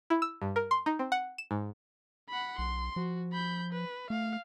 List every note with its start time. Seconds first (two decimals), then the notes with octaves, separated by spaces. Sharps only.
0.10 E4
0.22 E6
0.42 G2
0.56 A#4
0.71 C6
0.86 D#4
0.99 C4
1.12 F#5
1.38 E7
1.51 G#2
2.30 F#5 B5
2.58 B1 C6
2.96 F3 F#4
3.33 B5 G6
3.73 B4
4.10 A3 F5